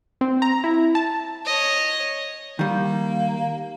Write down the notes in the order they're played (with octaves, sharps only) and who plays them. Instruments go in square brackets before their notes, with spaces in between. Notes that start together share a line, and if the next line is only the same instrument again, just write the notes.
[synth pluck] C4
A#5
E4
A5
[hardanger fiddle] C#5 D#5
[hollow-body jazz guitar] D#3 G3 [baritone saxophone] A#3